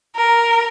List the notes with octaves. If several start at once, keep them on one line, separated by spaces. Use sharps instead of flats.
A#4